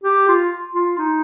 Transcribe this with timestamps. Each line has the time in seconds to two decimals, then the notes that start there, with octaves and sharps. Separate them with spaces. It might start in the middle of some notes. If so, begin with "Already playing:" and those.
0.04 G4
0.28 F4
0.75 F4
0.98 D#4